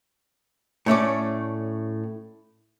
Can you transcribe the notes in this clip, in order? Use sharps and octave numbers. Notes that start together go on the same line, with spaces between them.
A2 A3 C#4 D5